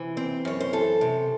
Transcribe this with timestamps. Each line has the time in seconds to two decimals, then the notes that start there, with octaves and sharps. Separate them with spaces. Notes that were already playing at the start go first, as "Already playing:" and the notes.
Already playing: C3 E3 C5
0.17 C4
0.45 F#2 C#5
0.60 C5
0.73 E3 A4
1.01 C3